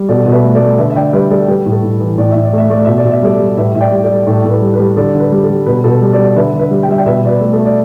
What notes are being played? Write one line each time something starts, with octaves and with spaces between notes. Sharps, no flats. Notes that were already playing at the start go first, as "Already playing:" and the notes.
Already playing: G3
B2 A4 D5
B2
B4 E5
A3
A4 D5
A3
D3 B4 E5
E5
D3 D5 G5
G3 B4 E5
G3 A4 D5
G3 B4
A2
A4
A2
E3
A2 D5
A2 E5
D5
A3 E5
A3 D5
B2 E5
D5
B2
E5
G3 A4 D5
G3
A2 B4 E5
A2 E5
D5 G5
G3
A4 D5
G3
A2 A4 D5
A2 A4
B4
G3
B4
G3
D3 A4 D5
D3
B4
G3
A4
G3
B2 B4
B2 A4
B4
G3
A4 D5
G3
D5
D3 B4 E5
D3
B4 E5
G3
G5
G3 E5
D5 G5
B2 B4 E5
B2 D5
B4
A3
A4
A3
D5